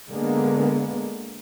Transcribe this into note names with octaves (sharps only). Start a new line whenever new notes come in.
D3 G#3 A#3 B3